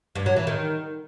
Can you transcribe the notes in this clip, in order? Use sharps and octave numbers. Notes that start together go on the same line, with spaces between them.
G2
F#3
E3
D#3